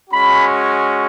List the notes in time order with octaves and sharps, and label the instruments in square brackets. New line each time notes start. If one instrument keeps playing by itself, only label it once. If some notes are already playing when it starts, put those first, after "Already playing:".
[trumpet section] G#3 C#4 F#4 B5